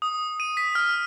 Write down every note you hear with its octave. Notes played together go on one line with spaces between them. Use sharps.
D#6
D#7
B6
F6